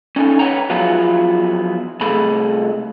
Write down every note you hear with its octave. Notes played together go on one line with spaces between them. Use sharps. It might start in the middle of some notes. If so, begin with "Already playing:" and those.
C#4 D#4 A4 G#5
B4 C#5 D5 F#5 G5 A#5
F3 F#3 B3 E4 F4 G#4
C2 C3 A3 G#4 A4 B5